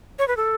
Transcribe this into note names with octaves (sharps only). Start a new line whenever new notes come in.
C#5
B4
A4